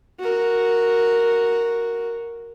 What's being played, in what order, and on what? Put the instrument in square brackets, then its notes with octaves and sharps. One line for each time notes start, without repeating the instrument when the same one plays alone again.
[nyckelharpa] F#4 A#4